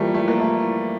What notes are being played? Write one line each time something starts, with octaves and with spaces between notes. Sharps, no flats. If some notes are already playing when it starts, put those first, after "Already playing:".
Already playing: E3 F3 G3 A3 A#3
A3
A#3
A3